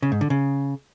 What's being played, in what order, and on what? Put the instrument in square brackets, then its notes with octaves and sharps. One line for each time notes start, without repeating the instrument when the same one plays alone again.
[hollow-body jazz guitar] C#3
G#2
D3
C#3